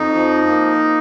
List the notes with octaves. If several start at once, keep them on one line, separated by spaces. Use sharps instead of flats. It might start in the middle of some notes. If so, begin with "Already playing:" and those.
Already playing: F2 D#4
F3
A#3